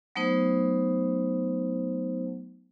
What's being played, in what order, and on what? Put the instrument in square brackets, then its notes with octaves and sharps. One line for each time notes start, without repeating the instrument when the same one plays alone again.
[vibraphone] F#3 A3 B3 D#4 C5